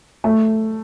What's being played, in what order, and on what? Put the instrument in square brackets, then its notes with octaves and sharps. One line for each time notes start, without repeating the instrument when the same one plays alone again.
[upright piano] A3